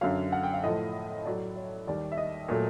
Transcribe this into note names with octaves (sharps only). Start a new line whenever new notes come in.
F#2 D3 F#3 F5
F#5
G5
F5
A2 F3 A3 D#5
A2 F#3 A3 D5
C#5
D#2 D#3 G3 D5
E5
D#5
A#2 F#3 A3